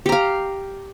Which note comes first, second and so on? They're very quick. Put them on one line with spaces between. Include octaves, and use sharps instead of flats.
G4 A#5 F5